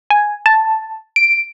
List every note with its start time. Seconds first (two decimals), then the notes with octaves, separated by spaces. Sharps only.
0.10 G#5
0.46 A5
1.16 D7